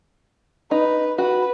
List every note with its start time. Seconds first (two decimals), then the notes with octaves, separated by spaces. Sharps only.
0.71 D#4 B4
1.18 F#4 B4